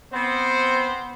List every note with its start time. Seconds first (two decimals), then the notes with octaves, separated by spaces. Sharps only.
0.13 B3 C4 C5